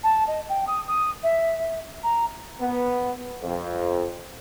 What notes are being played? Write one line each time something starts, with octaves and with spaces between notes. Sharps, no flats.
A5
D#5
G5
D#6
D#6
E5
A#5
B3
F2